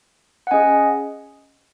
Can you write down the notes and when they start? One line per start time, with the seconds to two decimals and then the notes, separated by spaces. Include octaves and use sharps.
0.47 F#5
0.51 C#4 G#4 D#5 G#5